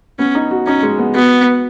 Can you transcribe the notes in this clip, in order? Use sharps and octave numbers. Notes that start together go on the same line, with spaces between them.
B3 C#4
D#4
F#4
C#4 D#4
G#3
B3
B3 F#4